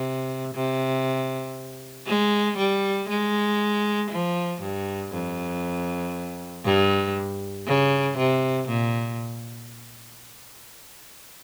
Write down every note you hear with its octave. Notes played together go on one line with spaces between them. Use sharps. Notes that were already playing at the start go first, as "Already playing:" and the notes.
Already playing: C3
C3
G#3
G3
G#3
F3
G2
F2
G2
C#3
C3
A#2